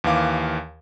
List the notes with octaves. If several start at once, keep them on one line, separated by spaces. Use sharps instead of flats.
D#2 E3 F5 D6